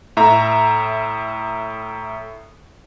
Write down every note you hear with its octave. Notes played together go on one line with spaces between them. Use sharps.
A2 E5 A#5